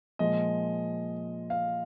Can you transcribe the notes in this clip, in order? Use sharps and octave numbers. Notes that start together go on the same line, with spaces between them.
A#2 F3 G#3 D#5
F5